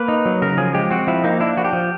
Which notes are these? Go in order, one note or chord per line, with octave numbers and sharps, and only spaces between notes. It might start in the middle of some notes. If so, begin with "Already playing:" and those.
Already playing: A#3 B4
D#4
F#3
C#3 A#4
F3 G#4
G#3 G4
C4 F#4
F3 E4
A#3 D#4
D4 E4
F3 F#4
G4
F3